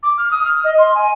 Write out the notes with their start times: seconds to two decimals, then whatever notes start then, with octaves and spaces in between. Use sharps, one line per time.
0.03 D6
0.18 F6
0.31 D#6
0.45 F6
0.64 D#5
0.79 C6
0.95 G#5